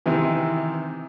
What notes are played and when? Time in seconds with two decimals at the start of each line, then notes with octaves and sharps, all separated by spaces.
0.06 C3 D#3 E3